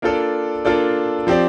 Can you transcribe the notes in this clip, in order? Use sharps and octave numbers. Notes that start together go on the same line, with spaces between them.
A#3 D4 F4 A4 D5
A#3 D4 F4 A4 D5
F3 C4 G4 D5